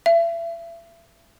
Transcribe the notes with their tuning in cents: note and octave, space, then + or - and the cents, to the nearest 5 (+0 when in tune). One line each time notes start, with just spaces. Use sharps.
E5 +35